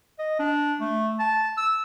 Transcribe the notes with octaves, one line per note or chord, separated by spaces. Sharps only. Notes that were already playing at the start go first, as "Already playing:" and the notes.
D#5
D4
A3
A5
E6